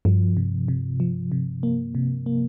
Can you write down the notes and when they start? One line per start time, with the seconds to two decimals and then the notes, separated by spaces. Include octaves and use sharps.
0.05 G2 F3
0.37 C3
0.68 C3
1.00 F3
1.32 C3
1.63 A#3
1.95 C3
2.26 A#3